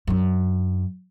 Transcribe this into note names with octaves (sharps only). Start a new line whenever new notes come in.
F#2 D4